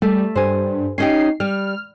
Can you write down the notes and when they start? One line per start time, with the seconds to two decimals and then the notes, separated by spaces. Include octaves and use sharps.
0.02 G3 A3
0.35 G2 C5 G#5
0.98 C#4 D#4 G4 C7
1.40 G3 F6